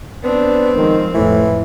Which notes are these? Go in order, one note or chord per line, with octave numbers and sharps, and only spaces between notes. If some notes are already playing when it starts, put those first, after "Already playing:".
B3 C4 D4
D#3 F3 G#3
A1 F2 A2 E3